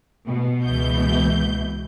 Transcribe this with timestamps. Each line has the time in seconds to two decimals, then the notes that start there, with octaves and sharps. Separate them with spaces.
0.25 B2
0.63 C#2 E3 G6